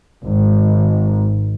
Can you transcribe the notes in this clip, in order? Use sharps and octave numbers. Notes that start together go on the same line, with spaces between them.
G#1